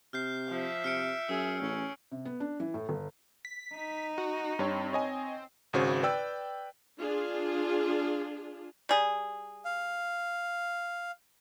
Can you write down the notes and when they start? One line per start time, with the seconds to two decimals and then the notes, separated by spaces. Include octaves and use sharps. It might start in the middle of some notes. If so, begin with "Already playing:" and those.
0.13 C3 F6 G6 C7
0.49 F3 E5
0.84 C3 F6 C#7 D7
1.29 F#2 G#4 E6
1.62 A1 C#4
2.12 C3
2.25 B3
2.40 D4
2.60 E3
2.74 A2
2.89 G1
3.45 B6
3.75 D#4
4.18 F#4
4.59 G2 C4 C#5
4.93 C#5 D#5 G#5
5.73 G#1 C#3 F#4 C5
6.03 B4 D5 G5 E6
6.99 D4 F4 G#4
8.89 G3 G#4
9.65 F5